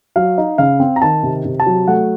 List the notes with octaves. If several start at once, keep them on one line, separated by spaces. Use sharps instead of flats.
F#3 F5
D#4
C#3 F5
C4
A#5
D#3 A5
C3
C3
A5
F#3
A3 F#5